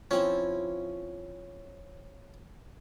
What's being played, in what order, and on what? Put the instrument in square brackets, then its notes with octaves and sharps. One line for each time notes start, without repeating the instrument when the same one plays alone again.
[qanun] F3 C4 E4 [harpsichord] C#4